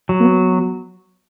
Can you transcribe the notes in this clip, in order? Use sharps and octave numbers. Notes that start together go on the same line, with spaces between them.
F#3
A#3
B3